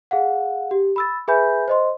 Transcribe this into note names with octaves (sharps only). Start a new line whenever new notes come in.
G#4 F5 F#5
G4
B5 E6 A6
G#4 B4 E5 G#5 B5 G6
C5 D#5 C6